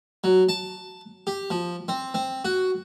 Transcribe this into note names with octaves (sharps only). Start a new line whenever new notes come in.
F#3
A5
G4
F3
C4
C4
F#4